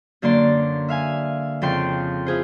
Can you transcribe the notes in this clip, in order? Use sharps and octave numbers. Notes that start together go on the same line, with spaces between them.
F#2 D3 A#3 D5 C6
E5 F5 G#5
F2 C#3 A4 G5 C6
E4 F4 G#4 C5